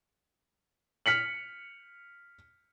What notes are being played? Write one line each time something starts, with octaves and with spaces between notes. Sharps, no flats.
F6 B6 C#7 F#7